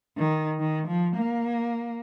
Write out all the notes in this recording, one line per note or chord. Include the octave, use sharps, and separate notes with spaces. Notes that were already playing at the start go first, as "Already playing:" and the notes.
D#3
D#3
F3
A#3